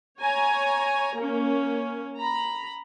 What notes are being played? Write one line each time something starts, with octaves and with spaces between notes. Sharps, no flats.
C#5 G#5 A#5
A#3 C#4
A#5 B5